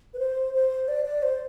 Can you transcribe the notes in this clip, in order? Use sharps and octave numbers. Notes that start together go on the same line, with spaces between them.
B4
C5
C5
D5
D5
C5